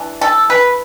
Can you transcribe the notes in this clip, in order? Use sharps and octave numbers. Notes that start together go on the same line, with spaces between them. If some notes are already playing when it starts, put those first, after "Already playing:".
Already playing: E3 D4
A4
B4